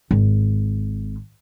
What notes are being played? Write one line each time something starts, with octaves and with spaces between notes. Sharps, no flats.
G#1